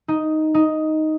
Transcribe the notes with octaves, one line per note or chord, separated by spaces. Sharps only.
D#4
D#4